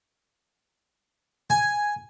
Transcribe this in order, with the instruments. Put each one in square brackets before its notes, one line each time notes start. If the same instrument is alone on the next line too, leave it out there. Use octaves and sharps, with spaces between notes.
[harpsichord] G#5